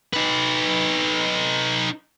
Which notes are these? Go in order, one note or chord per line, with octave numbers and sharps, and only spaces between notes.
D#4 B4